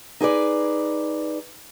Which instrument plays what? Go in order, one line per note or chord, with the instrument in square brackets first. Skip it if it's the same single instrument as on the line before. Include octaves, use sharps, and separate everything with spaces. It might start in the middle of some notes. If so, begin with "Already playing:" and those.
[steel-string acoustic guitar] D#4 G#4 B4 D5